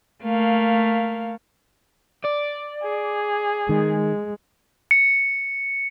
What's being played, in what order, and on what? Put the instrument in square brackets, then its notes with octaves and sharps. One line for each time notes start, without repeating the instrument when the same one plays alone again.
[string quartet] A3 A#3 F5
[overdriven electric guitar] D5
[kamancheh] G#4
[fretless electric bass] D#3 [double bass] G#3
[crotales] C#7